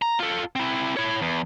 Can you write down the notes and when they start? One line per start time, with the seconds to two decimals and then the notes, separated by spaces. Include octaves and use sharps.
0.02 A#5
0.20 F4 A4
0.56 C4 E4
0.97 E4 C#5
1.22 E2